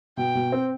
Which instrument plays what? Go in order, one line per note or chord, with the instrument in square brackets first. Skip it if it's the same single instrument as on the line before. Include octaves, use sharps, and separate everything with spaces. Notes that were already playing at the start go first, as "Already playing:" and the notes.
[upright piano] B2 [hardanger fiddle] G5
[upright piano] B2
C4